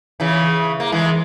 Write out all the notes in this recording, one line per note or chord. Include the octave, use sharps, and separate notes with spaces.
C#3 E3
A#3
E3 G#3